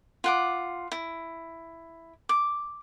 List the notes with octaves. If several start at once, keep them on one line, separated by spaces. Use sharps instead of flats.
F4 F#5 D6
E4
D6